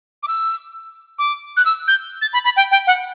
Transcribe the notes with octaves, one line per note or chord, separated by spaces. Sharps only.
D6
E6
D6
F#6
E6
G6
A6
B5
B5
G5
G5
F#5